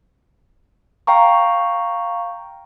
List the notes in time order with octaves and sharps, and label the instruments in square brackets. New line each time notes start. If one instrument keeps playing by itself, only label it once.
[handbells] F5 G5 A#5 C#6